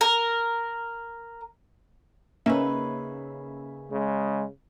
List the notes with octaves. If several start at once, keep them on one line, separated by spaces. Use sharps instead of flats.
A#4
C#3 A#3 C#4 D#4 B4 E5
C#3 G#3